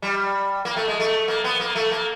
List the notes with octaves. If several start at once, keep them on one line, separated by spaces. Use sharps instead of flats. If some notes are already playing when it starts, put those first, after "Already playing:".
G3
A#3
A3
G#3
A3
A#3
B3
A#3
A3
A#3